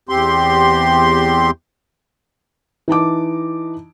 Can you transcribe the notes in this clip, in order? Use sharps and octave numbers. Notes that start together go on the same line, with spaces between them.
E2 C4 G4 C6
E3 D#4 A5 D6